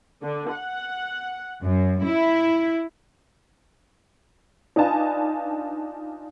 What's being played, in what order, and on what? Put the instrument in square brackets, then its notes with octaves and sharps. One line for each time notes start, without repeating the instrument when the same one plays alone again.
[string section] D3
F#5
F#2
E4
[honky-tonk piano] D4 D#4 F4 B4 G#5 A5